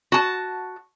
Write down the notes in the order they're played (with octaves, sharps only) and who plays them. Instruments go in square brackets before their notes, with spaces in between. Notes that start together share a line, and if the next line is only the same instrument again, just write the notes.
[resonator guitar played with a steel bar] F#4 A5